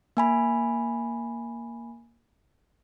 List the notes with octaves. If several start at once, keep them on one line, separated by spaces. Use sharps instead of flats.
A#3 G#5 B5